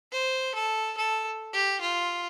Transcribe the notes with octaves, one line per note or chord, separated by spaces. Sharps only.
C5
A4
A4
G4
F4